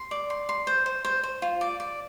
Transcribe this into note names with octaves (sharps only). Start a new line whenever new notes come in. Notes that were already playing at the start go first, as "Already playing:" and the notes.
Already playing: C6
D5
C6
C6
C5
C5
C5
C5
F4
D5
D5